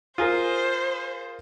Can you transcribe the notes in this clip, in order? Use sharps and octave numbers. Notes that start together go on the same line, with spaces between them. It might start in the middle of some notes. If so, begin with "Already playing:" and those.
F4 G#4 A#4 C5